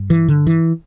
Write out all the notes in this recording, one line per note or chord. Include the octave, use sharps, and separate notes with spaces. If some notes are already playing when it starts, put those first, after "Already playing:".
Already playing: G2
E3
D3
E3